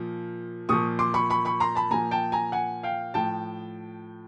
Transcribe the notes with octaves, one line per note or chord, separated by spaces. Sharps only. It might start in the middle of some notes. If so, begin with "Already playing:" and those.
Already playing: A#2 F3
A#2 F3 C#6 D#6
C6 D6
B5 C#6
B5 C#6
B5 C#6
A#5 C6
A5 B5
A#2 F3 G#5 A#5
G5 A5
G#5 A#5
F#5 G#5
F5 G5
A2 F3 G5 A5